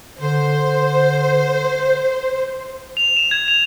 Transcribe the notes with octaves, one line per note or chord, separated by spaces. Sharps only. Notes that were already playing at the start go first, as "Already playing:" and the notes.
D3 C5
F7
E7
G#6
F7